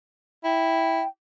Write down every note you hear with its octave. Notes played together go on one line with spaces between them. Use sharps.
E4 G5